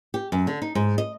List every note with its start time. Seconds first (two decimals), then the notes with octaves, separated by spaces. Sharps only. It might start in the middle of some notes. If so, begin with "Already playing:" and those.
0.14 G4
0.32 F#2
0.47 D3
0.62 D#4
0.75 G#2
0.98 D#5